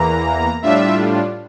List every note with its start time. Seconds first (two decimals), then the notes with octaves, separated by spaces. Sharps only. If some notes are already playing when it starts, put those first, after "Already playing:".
Already playing: E2 E3 A#3 A#5
0.62 A2 G3 D4 F4 E5